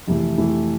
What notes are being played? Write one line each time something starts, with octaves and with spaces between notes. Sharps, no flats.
F2 C3 E3 A3
F2 C3 E3 A3